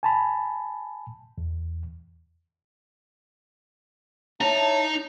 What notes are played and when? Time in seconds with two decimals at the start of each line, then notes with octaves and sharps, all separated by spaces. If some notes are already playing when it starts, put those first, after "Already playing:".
0.03 G#5 A5 B5
1.38 E2
4.41 D#4 E4 C#5 A5 A#5